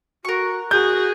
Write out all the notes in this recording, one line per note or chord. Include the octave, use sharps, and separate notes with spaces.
F#4 A#4 C#6
F#4 G#4 G6